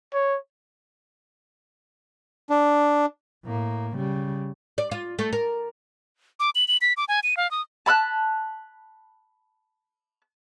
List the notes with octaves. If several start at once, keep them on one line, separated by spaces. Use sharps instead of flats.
C#5
D4
A2 A#3
C#3 G3
D5
F4
A3
A#4
D6
F#7
F#7
B6
D6
G#5
D#7
F5
D#6
A5 B5 F6 F#6